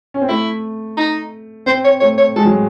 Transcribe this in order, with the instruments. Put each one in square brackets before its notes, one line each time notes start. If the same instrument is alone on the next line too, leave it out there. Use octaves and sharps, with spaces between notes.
[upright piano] C#4
C4
[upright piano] A3 [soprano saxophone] E4
[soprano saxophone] D#4
[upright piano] C4 [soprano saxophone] C5
[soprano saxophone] C#5
[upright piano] A3 [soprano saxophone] C#5
[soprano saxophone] C#5
[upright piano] G#3 [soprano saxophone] A4
[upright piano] F#3